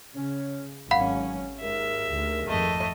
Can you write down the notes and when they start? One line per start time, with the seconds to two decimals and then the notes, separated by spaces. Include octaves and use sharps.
0.15 C#3 C#4
0.91 G#1 F#3 C#4 F5 F#5 B5
1.61 D#2 G#2 G#4 A#4 E5
2.07 D2
2.47 G#1 F2 A3 D#5